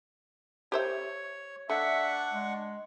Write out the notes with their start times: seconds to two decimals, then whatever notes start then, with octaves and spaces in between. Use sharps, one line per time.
0.72 G4 C5 C#5 E5
1.70 A3 D4 E5 F#5 C#6
2.33 G#3